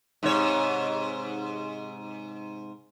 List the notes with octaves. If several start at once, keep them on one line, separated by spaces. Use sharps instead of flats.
G#2 C3 C#5